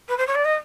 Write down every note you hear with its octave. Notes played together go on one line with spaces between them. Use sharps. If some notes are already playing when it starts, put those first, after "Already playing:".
B4
C5
C#5
D5
D#5